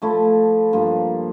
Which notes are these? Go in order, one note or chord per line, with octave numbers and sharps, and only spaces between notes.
F3 A3 E4
G2 F3 A#3